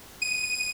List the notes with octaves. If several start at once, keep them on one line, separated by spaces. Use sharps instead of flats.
D#7